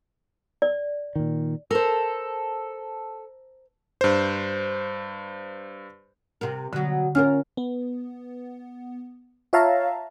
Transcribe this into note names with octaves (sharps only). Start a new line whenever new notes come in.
D5
A#2 D#3
A4 A#4 C5
G2 C5
C3 A#4
B2 D3 F#3
C#4 F4 F#4 A#4 F6
B3
F4 C#5 E5 F5 A5 A#5